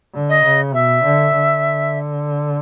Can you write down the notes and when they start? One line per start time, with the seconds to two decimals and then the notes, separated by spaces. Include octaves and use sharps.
0.15 D3
0.29 D#5
0.44 C#3
0.74 B2 E5
1.04 D3
1.34 D3